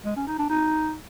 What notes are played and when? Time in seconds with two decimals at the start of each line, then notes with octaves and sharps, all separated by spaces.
0.05 G#3
0.16 C#4
0.27 D#4
0.39 D4
0.50 D#4